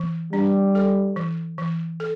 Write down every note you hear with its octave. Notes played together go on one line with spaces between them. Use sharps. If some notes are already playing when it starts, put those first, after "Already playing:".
Already playing: E3
G3 D4
A4
E3
E3
A4